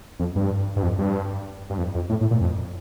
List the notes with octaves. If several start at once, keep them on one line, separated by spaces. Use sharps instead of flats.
F2
G2
G2
F2
G2
G2
F2
F2
A2
A2
A#2
F2